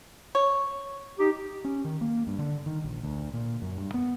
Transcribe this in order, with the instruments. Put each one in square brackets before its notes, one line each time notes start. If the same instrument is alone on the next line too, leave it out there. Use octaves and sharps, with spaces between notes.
[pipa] C#5
[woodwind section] D#4 G4
[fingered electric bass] C#4
D#3
A#3
G2
D3
D#3
A#1
D2
A#2
F#2
G2
B3